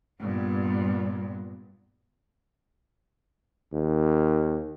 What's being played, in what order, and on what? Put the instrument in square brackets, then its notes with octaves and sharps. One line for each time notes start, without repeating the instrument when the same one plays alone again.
[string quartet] G2 [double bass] A#2 B3
[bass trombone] D#2